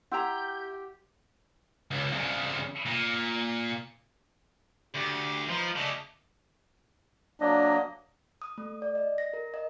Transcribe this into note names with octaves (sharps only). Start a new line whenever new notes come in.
E4 G4 F#5 G5 A#5 C6 E6 G6
C#2
C2 C#3
A#2
D2 G4
F3 D#4 B4 C5
C#3 A3 D5 D#5 A5
F#3 A#3 D4 D#5
D#6
A3
D5
D#5
A#6
A#4
D#5